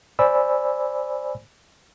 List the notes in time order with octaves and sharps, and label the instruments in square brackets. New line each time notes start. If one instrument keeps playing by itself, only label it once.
[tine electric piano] C5 D5 G#5 B5 E6